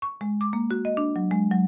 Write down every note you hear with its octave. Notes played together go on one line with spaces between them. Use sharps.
C#6
G#3
D6
A#3
F#4
D#5
D4
F#3
G#3
F#3